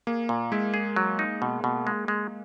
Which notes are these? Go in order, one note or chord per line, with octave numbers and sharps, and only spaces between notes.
A#3 G#4
A#2
G#3 E4
G#4
F#3
D#4
B2
B2
G#3
G#3